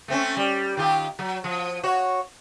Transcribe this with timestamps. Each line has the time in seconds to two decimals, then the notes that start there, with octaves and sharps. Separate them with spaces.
0.08 A3 C4 C#4
0.37 G3
0.77 D#3 F4 G4
1.19 F#3
1.44 F3
1.83 F#4 C#5